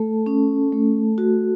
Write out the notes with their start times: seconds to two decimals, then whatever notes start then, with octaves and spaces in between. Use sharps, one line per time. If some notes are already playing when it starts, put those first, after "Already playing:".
Already playing: A3 A4 A5
0.26 C#4
0.72 A3
1.18 F#4